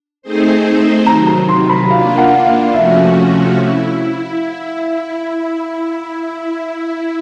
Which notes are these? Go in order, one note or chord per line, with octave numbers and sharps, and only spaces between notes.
A3 C4 D#4 G#4 C5
C3 D#3 F#3 A#5
A#5
C6
B5
A#3 D4 F4 F5
F#5
F5
C3 F3 A3 C#4 F#4 E5
E4